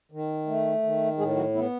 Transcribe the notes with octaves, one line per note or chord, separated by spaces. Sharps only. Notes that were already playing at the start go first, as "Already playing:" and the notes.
D#3
A3
D#3
A2 G#3 G#4
F#3 F#4
E3 B3 E4